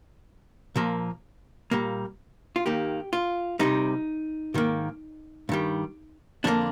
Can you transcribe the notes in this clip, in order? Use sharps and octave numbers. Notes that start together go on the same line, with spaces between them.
A#2 F3 A#3
A#2 G3 A#3
F4
D#2 D#3 A#3 G4
F4
C2 C3 G3 D#4
G#2 D#3 A#3
G2 D#3 G3
F2 D3 G3 A#3 D4